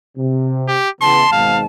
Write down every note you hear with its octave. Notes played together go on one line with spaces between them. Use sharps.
C3
G4
C#3 E3 B3 A5 C6
G#1 G#2 B2 F5